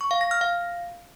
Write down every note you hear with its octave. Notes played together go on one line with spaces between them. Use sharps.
C#6
F5
A#6
F6
F5